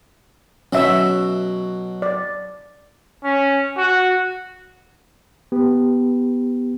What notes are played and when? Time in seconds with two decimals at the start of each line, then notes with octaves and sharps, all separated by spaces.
0.73 B2 F#3 C#4 E5 E6
2.02 D5
3.24 C#4
3.78 F#4
5.52 B3 G4